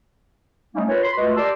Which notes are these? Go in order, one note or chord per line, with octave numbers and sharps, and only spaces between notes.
F#3 G3 A3 A#3 C#4 D#4
F4 A#4 B4 C#5
B5 C6
G#3 A3 F4 F#4 B4 D#5
G4 A#4 D5 A5 C6 E6